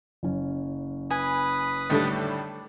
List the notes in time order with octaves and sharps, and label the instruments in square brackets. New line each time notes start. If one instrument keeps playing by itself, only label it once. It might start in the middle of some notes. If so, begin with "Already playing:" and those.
[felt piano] F#1 C#4
[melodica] B4 B5 D#6 [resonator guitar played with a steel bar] G#5
[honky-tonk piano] A2 D3 G3 [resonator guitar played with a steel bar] D#3 D4 A4